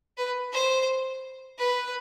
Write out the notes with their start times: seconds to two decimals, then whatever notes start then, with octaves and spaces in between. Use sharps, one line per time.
0.17 B4
0.53 C5
1.59 B4